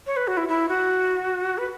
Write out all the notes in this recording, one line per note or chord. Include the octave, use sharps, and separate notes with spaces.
C#5
B4
F#4
E4
E4
F#4
B4